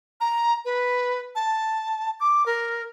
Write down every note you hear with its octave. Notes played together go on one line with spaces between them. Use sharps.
A#5
B4
A5
D6
A#4